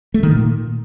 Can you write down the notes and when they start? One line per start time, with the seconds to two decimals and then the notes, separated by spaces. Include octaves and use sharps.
0.14 A3
0.23 D#3
0.32 A#2